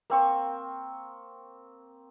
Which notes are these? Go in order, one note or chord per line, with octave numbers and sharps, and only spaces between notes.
A#3 C4 C#6